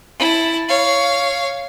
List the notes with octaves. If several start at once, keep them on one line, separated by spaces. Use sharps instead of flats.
E4 A5
C#5 F5